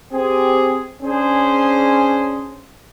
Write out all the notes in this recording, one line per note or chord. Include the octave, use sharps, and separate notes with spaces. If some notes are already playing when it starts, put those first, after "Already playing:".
C4 G4 G#4
C#4 D4 G#4 C5